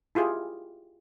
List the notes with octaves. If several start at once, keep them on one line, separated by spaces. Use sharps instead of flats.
E4 F4 G4 G#4